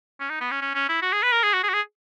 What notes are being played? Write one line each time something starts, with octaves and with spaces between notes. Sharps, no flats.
C#4
D#4
B3
C#4
C#4
C#4
E4
F#4
G#4
B4
A#4
G#4
F#4
G#4
F#4
G#4